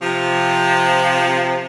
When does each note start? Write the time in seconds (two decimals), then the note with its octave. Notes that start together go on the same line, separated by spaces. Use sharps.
0.02 C3 F3